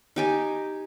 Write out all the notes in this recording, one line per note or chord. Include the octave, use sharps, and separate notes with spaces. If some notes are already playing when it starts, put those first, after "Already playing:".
D#4 G4 G#5